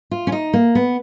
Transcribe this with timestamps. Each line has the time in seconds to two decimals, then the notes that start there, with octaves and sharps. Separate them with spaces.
0.11 F4
0.27 C#4
0.32 D#4
0.54 A#3
0.75 B3